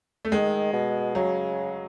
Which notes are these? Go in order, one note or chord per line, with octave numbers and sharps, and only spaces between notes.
A3
D#3 G#3
B2
C#3 F#3